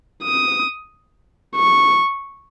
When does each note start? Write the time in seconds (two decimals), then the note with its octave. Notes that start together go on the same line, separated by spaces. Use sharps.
0.23 D#6
1.56 C#6